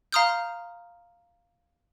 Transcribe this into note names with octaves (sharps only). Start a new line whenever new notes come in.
F5 A#5 C6 D#6 F6 G6